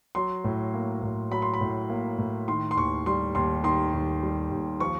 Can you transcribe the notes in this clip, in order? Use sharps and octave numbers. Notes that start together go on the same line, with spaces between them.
F#3 C6
A2
A#3
A2
F#3 B5
C6
B5
A2
A#3
A2
D#3 C6
C6
D#2 C#6
G3 C6
D#2 C6
D#3 C6
D#2
G3
D#2
F3 C#6